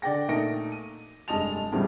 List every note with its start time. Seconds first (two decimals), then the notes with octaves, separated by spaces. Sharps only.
0.02 D3 D5 F#5 G5 A#6
0.28 A#2 A3 D#4 A#6 D7
0.72 D#7
1.28 F1 G2 G#3 D#5 A5 F7
1.72 E2 A2 C#3 F3 G3